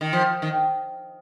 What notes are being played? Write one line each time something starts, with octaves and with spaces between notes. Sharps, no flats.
D#3
F3
D#3